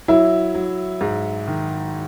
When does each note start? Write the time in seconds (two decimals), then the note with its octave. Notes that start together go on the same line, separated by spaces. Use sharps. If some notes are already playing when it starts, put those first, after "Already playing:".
0.08 F#3 E4
0.55 F#3
1.01 G#2
1.48 D#3